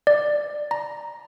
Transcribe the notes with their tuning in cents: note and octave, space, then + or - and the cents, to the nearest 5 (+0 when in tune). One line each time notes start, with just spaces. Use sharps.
D5 +10
A#5 +5